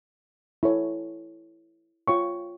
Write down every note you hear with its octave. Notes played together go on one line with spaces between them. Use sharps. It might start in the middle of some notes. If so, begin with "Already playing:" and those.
E4 A4 C#5
F4 C#5 G5 C#6